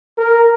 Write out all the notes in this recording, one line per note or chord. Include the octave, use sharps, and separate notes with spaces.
A#4